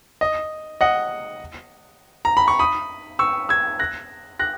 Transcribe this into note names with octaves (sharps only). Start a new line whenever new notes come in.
D#5
D#5 F#5
A#5
B5
C#6
B5 D#6
C#6 E6
E6 G#6
F#6 A#6
F#6 A#6